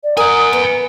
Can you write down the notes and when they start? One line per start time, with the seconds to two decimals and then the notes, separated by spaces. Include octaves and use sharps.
0.04 D5
0.17 A#4 F#5 G#5 D#6
0.53 B3 B4